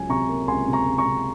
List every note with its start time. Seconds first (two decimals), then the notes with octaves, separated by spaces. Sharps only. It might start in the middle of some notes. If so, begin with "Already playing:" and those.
Already playing: C#2 F#3 G#5
0.10 C3 A#5 C#6
0.29 A#3
0.47 C#2 G#5 C6
0.68 C3
0.73 A#5 C#6
0.86 C#2
0.98 A#5 C#6
1.06 C3